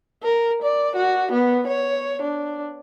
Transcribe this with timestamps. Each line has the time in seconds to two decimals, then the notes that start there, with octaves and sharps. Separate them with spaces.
0.23 A#4
0.62 D5
0.96 F#4
1.32 B3
1.67 C#5
2.22 D4